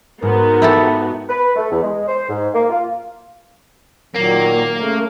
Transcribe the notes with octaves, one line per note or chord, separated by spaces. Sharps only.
G#2 G#3 B3 D#4 F#4 A#4
E4 G4 A4
B4
A3
E2
G#3
C5
G#2
A#3
F4
A#2 D#3 F#3 A#3
C#3 A3 A#4